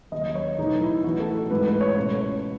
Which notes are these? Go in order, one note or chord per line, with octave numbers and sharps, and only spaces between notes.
D#2 C#3 F#3 C#4 D#5
C#5
E2 B2 F#3 A3 D#4
E4
A1 A2 E3 B3 F#4
A4
A1 G#2 E3 B4
B4
C#5
C#2 B2 A3 C#4 C#5